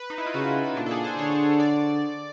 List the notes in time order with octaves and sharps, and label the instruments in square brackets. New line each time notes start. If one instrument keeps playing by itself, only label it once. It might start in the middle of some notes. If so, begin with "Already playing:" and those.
Already playing: [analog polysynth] B4
D#4
E4
F4
[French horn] C#3 [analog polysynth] F#4
[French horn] A#2 [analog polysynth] D4
[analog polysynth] A4
G#4
C5
[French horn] D3 [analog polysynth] C#5
[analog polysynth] D5